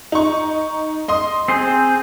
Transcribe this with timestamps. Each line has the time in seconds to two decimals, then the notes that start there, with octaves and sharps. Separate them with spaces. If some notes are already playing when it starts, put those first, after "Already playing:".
0.12 D#4 C#6
1.08 D#5 C6 D#6
1.48 C4 G#4 C5 C7